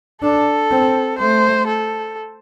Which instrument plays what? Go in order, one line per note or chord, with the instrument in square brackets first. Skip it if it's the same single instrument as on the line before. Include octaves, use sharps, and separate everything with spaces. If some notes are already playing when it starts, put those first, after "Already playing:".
[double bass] D4 [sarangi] A4
[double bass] C4
[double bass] A3 [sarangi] C5
[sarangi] A4